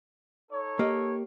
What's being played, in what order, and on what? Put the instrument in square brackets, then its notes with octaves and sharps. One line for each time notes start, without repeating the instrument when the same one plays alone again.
[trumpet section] D#4 A4 C#5
[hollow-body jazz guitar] A#3 G4 D#5